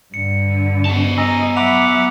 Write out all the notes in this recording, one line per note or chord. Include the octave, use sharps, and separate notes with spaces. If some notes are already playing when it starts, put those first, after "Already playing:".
G2 D3 C#7
B3 A5
D#5 G#5 A#5 E6
F#3 E5 F#5 B5 D6 C#7 F7